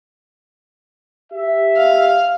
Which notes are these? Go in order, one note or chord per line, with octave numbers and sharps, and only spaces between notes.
G4 E5
F5